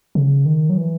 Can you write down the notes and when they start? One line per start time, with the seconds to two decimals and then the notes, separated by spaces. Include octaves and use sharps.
0.15 C#3
0.46 D#3
0.70 F#3
0.77 E3